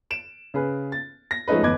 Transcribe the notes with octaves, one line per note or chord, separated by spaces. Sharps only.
D7 E7
C#3 G#4 B4
A6
A#6
F3 G#3 A3 C#4 D#4 B4
G1 E2 B4 D#5 D6 G#6